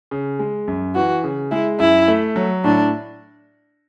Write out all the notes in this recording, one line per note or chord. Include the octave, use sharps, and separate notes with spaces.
C#3
G#3
F#2
E3 F#4
C#3
G#3 E4
F#2 E4
A3
F#3
A2 D4